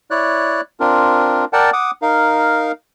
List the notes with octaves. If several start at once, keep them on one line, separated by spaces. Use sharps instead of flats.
E4 C#5 D5 F#6
C4 D4 F4 A#4
A#4 D5 F#5 G5 A5
F#5 D6 D#6
D#4 A#4 F5